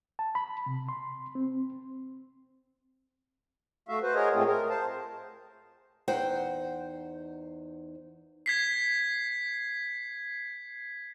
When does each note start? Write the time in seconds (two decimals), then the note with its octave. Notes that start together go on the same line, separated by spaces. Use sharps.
0.19 A5
0.35 B5
0.66 C3
0.89 C6
1.35 C4
3.89 A3 F#4 E5 F5
4.02 F#4 B4 C5
4.15 F#4 G#4 A#4 C#5 D#5
4.34 A2 G#3 A3 C4 F4 G#4
4.46 A#4
4.70 C5 F5 A5
6.08 E2 D#4 C5 F#5 G5
8.46 G#6 B6 C7